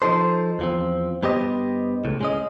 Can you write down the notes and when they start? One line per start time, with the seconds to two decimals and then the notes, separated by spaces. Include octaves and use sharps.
0.02 F3 D#4 A4 C5
0.59 E2 F3 C4
1.23 G2 B3 G4 C5 D#5
2.05 C#2 A2
2.21 G#3 C#4 D#5